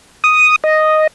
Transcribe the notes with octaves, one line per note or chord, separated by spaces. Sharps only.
D#6
D#5